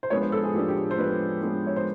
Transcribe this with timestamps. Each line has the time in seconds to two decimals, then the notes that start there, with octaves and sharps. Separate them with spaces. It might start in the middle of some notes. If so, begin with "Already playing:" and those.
0.03 C5
0.10 F3 G#3 B3 D4 C#5
0.21 C5
0.32 A4
0.43 G#4
0.54 F3 G#3 B3 D4 G4
0.69 G4
0.91 C5
0.98 F3 G#3 B3 D4 B4
1.42 F3 G#3 B3 D4
1.67 C#5
1.76 C5